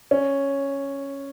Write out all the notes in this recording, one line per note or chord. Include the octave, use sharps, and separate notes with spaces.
C#4